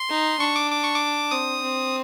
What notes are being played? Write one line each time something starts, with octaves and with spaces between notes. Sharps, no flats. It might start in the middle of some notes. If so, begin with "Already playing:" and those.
Already playing: C6
D#4
D4 C#6
D6
D6
C#6
D6
C4 D#6
C4